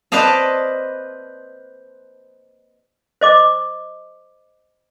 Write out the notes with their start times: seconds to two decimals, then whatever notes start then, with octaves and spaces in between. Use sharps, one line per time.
0.12 B4 C5 D5 D#5 F5 A5
3.21 C5 D#5 D6